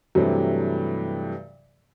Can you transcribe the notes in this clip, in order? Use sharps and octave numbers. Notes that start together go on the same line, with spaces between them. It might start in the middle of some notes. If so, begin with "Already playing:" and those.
G2 C3 E3 F#3 A3